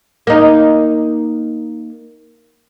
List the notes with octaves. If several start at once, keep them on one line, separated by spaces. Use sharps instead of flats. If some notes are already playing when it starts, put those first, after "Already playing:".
A#3 D#4